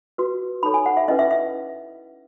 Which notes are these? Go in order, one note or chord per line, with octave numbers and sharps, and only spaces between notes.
F#4 B4
D#4 A4 C#5 B5
G#5
F#5
E5
C#4 E4 B4 D#5
E5
E5